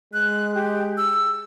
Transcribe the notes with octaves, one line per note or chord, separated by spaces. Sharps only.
G#3 F#6
G4
E6